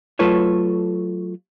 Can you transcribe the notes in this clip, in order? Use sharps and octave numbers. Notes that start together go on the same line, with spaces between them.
F#3 A3 F4 A4 B4 C#5